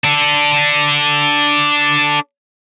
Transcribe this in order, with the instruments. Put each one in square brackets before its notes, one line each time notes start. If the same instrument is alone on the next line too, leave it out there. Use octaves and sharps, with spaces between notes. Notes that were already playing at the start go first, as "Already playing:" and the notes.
[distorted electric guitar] D4 A4